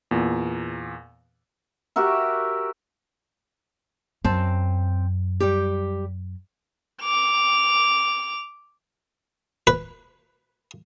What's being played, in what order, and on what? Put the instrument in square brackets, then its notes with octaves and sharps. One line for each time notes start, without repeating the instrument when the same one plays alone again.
[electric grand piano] E2 A#2
[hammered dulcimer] F#4 G4 A#4 E5
[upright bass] F#2 [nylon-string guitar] C4 A5
[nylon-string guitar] G3 G4
[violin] D6 F7
[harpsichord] B4